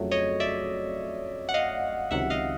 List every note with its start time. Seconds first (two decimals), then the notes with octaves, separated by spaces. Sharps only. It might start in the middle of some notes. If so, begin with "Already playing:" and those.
Already playing: F2 C#3 F#3 A3
0.11 C#5 D#5
0.40 D5 E5
1.49 F#5
1.54 D#5 F5
2.11 C#2 C3 D#3 F#3 E5 F#5
2.30 D#5 F5